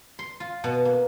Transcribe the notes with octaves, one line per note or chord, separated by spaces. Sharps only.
C6
F4
B2
A#3